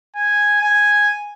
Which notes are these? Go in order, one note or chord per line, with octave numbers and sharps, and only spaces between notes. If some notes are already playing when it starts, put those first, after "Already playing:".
G#5
G#5